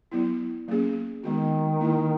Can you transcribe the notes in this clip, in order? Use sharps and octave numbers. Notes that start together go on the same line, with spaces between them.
F#3 B3 E4
F#3 A#3 C#4 G#4
D#3 G#3 B3 F#4
A#3 E4 A#4